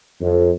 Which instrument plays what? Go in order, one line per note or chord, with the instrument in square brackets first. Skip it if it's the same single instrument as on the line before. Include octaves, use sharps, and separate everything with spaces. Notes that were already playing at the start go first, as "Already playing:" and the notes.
[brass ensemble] F2